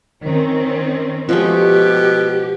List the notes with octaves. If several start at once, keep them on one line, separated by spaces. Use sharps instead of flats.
D#3 C4 C#4
B2 F3 G#3 A3 G4